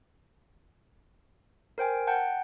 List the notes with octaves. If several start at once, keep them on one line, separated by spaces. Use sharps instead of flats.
A#4 C5 G5 G#5
F#5 G5 A5 G6